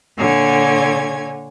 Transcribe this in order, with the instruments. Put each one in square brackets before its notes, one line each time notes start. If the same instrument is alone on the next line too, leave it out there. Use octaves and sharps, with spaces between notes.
[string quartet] A#2 D3 C#5 G#5 G#6